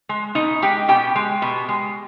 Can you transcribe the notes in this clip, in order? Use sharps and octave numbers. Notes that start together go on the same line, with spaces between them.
G#3
B2 D#4 D#5
G#3 G4 G5
B2 G4 G5
G#3
B2
G#3